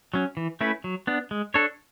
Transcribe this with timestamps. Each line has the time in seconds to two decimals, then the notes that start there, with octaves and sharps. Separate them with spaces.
0.14 F#3 C#4
0.37 E3
0.61 A3 C#4 E4 B4
0.84 F#3
1.07 B3 D4
1.31 G#3
1.54 D4 A4 C#5